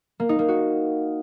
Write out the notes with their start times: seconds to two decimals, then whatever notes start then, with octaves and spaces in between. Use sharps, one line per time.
0.20 A#3
0.29 D#4
0.39 A#3
0.48 F#4